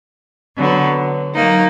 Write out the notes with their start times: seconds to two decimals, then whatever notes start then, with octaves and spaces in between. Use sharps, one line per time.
0.56 D3 F#3 B3
1.34 F#3 A#3 D#4